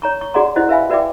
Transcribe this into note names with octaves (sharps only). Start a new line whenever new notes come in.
C#5 A#5 C#6
C#6
F#4 G#4 D5 F#5 A#5 C6
E4 G4 C5 D#5 F#5
B4 E5 F5 G#5 B5
F#4 B4 D5 E5 G5 D6